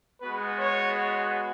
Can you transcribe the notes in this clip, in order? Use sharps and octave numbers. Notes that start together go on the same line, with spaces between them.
G#3 B3 F#4 B4
C#5